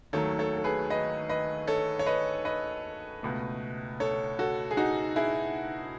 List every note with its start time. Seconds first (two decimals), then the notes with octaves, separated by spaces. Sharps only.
0.13 D#2 D#3 F#3 A3 A4 C#5
0.39 A4 C#5
0.57 A4
0.64 G#4 B4
0.90 B4 D#5
1.29 B4 D#5
1.68 A4 C#5
1.99 C#5
2.06 B4 D#5
2.45 B4 D#5
3.23 C#2 B2 A3
4.00 A4 C#5
4.39 F#4 A4
4.71 G#4
4.77 D#4 F#4
5.16 E4 G#4